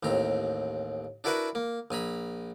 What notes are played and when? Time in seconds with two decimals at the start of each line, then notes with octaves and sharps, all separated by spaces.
0.03 A1 D#2 C4 A#5
1.24 D4 E4 F#4 A#4 B4 F#5
1.55 A#3
1.91 A#1 G#5 A#5 B5